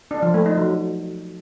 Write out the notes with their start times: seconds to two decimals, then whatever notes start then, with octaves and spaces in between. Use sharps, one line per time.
0.11 D4
0.22 F3
0.34 A3
0.46 D#4
0.57 F#3